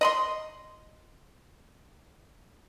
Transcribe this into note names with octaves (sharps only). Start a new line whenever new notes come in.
D#5 B5 C6